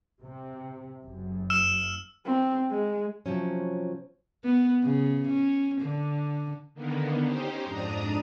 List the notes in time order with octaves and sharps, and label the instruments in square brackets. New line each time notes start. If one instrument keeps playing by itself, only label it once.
[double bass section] C3
F#1 F#2
[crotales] E6 F6 E7
[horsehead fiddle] C4
G#3
[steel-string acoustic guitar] C3 F3 F#3 C#4
[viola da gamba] B3
C#3
C#4
D3
[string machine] D3 D#3 A#3 B3
C#4 D#4 G4 C5
F2 G#2 D4 A#5 D#6